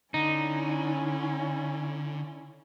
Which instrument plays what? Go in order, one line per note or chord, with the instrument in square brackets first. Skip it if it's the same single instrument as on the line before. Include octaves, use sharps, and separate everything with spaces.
[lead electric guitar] D3 [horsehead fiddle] C#4 E4 [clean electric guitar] D#4